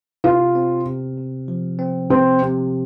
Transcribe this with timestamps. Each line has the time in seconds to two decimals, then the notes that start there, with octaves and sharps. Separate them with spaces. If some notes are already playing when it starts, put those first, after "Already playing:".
0.24 C3 F4
0.55 C4
0.86 C3
1.18 C3
1.48 F3
1.79 C4
2.10 C3 C4
2.42 C3